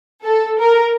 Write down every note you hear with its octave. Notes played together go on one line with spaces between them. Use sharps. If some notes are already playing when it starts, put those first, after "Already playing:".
A4
A#4